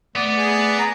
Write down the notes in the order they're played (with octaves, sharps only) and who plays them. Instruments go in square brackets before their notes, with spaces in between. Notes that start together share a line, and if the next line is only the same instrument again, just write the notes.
[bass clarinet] A3 [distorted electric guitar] B3 [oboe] D5
[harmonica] G#4
[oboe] A#5